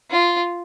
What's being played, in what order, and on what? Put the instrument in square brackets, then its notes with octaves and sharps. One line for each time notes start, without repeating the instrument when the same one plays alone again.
[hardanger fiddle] F4